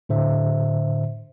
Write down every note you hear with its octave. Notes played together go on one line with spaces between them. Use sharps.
A2 D3 C5 E5